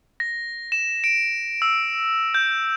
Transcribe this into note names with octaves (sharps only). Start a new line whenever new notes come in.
A#6
E7
D7
E6
G6